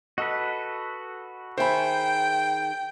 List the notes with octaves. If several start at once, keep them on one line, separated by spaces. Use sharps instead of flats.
F#4 A4 B4 D#5
D#3 G#4 C5 E5 G5 B5